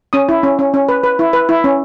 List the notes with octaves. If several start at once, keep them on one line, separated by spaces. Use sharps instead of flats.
C#4 D#6
E4
C#4
C#4
C#4
B4
B4
E4
B4
E4
C#4